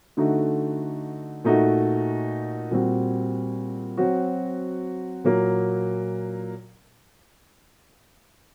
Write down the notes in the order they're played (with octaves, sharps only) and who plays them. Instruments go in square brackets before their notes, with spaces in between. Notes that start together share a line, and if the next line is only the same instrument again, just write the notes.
[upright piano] D3 A3 D#4 F#4
A#2 A3 D#4 F#4
A#2 G3 C4 F#4
F#3 C4 F#4
A#2 F#3 A#3